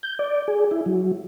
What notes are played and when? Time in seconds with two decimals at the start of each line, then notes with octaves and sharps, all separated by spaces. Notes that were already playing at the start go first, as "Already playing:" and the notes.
0.03 G6
0.19 D5
0.48 G#4
0.71 E4
0.86 F#3